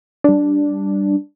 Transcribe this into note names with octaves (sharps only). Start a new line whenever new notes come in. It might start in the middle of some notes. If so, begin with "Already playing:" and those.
G3 D4